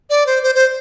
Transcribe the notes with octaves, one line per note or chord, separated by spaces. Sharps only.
D5
C5
C5
C5